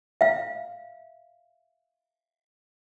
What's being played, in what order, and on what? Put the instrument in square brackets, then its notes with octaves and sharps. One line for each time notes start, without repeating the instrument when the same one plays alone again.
[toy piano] E5 F5